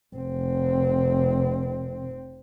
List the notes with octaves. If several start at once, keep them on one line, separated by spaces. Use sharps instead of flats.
F1 C4